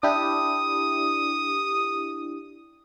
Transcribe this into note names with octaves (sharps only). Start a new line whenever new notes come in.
D4 E4 G4 D#6